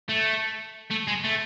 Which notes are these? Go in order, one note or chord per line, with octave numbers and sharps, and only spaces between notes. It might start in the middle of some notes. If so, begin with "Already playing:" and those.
A3
A3
G#3
A3